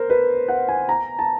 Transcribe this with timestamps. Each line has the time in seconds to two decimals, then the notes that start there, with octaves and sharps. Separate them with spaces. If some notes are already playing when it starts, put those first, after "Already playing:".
Already playing: A#4 C5
0.10 B4
0.48 F#5
0.68 G#5
0.89 A#5
1.19 A5